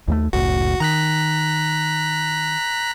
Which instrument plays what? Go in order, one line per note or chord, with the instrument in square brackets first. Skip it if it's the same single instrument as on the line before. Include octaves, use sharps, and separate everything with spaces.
[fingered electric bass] D#2 G#3 A3
[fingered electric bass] F#1 C#2 A2 [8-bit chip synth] F#4
[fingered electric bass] D#3 [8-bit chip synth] A#5 F#6 B6